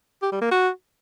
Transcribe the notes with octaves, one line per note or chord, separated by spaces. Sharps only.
G4
G3
A#3
F#4